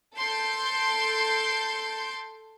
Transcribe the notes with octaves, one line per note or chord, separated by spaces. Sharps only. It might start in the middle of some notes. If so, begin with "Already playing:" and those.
A4 C6 G6 D7